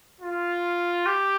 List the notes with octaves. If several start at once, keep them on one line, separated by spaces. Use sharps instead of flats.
F4
G4